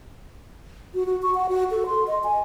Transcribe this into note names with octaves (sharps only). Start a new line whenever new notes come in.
F#4
F#4
C#6
F#5
F#4
A4
C6
D#5
G#5